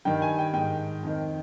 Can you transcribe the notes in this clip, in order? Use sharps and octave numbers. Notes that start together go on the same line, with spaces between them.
G2 D#3 G5
G#5
G5
G#2 D#3 G5
F2 D#3